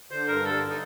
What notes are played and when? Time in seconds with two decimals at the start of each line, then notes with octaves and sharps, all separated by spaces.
0.11 D3 C5
0.28 G2 A#4
0.45 D3 A4
0.70 D#4